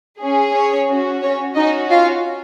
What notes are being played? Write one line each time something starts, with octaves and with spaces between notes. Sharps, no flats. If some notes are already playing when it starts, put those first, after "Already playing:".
C#4 G#4
C#4 C#5
C#4 F#4
C#4 C#5
C#4 D#4 F#4 D#5
F4 F5